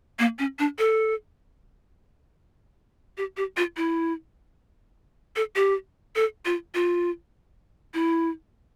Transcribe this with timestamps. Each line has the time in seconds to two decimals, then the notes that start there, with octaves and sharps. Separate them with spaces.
0.19 A#3
0.39 C#4
0.59 D4
0.78 A4
3.17 G4
3.37 G4
3.57 F4
3.77 E4
5.36 A4
5.56 G4
6.15 A4
6.45 F4
6.74 F4
7.94 E4